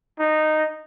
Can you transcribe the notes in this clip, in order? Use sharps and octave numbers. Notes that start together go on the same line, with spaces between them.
D#4